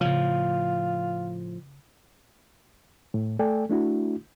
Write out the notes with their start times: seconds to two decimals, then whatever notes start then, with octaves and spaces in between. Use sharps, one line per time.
0.01 A2 C#3 F3 F4
3.14 A2
3.39 A3 A4 D5 G5 G#5
3.69 A3 D4 E4 F#4